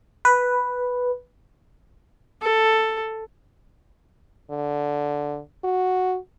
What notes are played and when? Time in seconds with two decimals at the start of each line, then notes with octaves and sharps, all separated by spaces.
0.25 B4
2.42 A4
4.51 D3
5.64 F#4